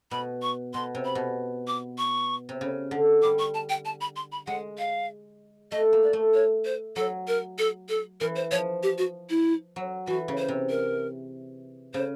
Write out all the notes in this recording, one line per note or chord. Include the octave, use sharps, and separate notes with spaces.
B2 B5
C#6
B2 C6
C3
B5
B2
D6
C#6
C3
C#3
D3
G3 D6
C#6
A5
G5
A5
B5
C6
B5
G#3 F#5
F5
A3 D#5
A#3
D5
A3
C#5
C5
F#3 A4
A#4
A4
A4
E3 A#4
C5
F3 C#5
G4
F#4
E4
F#3
E3 F#4
C#3
C5
C3
A#4
C#3 C5